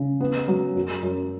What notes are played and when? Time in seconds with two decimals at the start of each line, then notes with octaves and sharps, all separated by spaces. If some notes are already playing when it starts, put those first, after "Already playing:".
Already playing: C#3
0.20 B3
0.48 F#3
0.75 F#2
1.03 F#2